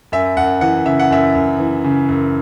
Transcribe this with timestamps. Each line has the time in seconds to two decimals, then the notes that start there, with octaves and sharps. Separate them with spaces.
0.12 F#2 E5
0.37 F#2 F#5
0.61 E3 F#5
0.85 C#3 E5
0.99 F#5
1.10 F#2 E5
1.35 F#2
1.59 E3
1.84 C#3
2.09 F#2